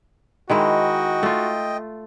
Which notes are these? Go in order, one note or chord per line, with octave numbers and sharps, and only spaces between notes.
D#3 G#3 E4 F#4 D#5 G5
A3 F4